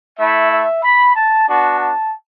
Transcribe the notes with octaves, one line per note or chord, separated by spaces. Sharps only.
A3 E4 E5
E5
B5
A5
B3 D4 F#4 A5
A5